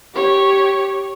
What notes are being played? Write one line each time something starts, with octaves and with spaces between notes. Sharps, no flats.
G4 C#5